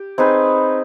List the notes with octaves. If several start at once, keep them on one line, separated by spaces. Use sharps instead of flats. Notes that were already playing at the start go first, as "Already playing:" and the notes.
Already playing: G4
C4 D#4 G#4 B4